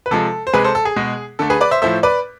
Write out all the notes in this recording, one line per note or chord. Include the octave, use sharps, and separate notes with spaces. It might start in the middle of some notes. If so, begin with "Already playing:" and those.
B4
C3 F3 G#3 A4
C5
C3 G#3 G#4 B4
A4 C5
A4
G#4
B2 G#3
D3 A3 A4
G#4 B4
B4 D5
C5 E5
A2 F3 A3 C5 E5
B4 D5